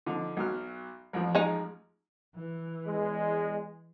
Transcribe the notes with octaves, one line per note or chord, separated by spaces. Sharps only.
D3 F3 D#4
B1 F#3 F6
A1 F2 F3
G#3 D#4
E3
E2 G#3